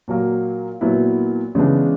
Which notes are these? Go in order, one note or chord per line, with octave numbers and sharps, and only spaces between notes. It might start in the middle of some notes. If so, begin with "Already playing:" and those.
A#2 F#3 A#3
A#2 F#3 B3 E4
C#3 E3 G#3 B3 D4